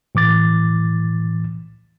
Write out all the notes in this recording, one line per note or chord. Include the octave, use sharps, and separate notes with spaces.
A2 E3 D6 A6